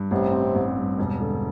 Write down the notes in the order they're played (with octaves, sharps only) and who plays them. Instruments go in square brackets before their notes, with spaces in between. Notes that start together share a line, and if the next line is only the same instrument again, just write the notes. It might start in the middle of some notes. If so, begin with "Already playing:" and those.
Already playing: [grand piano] G2
[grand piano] A1 [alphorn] C3
[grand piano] C4
A1
G2
E1
D3